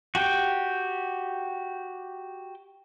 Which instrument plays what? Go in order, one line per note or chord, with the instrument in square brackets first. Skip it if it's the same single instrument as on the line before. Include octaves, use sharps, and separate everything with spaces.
[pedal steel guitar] F#4 G4 G5